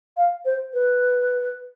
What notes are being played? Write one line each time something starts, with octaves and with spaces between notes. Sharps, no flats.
F5
C5
B4